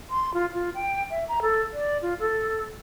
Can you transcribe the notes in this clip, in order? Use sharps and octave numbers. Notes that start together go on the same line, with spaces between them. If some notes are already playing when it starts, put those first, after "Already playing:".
C6
F4
F4
G5
E5
A#5
A4
D5
F4
A4